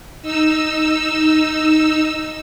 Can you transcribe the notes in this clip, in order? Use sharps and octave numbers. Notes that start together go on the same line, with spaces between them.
D#4 E6